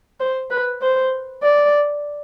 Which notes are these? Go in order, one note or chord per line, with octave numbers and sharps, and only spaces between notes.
C5
B4
C5
D5